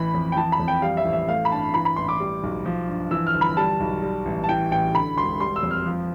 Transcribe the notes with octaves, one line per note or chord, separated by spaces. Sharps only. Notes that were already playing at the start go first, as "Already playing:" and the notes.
Already playing: A1 E3 B5
F2
G5
E3 A5
B5
F2
G5
G3 F5
E5
A1
E5
A3 F5
B5
G2 A5
E3 B5
B5
A1 C6
D6
G3
B1
F3
G2
E3 E6
F6
G1
B5
G3 A5
B1
G3
A1
A5
E3 G5
A1 G5
D3 B5
E1 C6
G3 C6
E6
F2
F6
F3